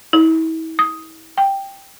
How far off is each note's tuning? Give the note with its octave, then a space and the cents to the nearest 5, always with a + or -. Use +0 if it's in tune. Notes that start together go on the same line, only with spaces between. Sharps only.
E4 -40
D#6 +10
G5 +5